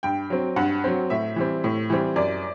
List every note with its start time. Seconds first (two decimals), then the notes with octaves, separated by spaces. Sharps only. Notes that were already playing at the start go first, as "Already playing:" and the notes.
0.03 G2 G5
0.30 F#3 C4
0.56 G2 F#5
0.84 F#3 C4
1.10 A2 E5
1.36 E3 G3 C4
1.64 A2
1.90 E3 G3 C4
2.16 F#2 D5